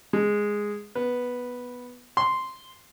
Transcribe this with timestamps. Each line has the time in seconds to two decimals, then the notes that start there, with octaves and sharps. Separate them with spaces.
0.13 G#3
0.95 B3
2.17 C6